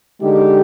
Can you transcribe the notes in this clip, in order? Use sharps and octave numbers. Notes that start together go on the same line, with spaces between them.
D3 G#3 D#4 G4